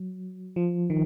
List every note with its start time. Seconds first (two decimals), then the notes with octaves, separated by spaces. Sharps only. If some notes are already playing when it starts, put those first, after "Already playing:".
Already playing: F#3
0.56 F3
0.90 D#3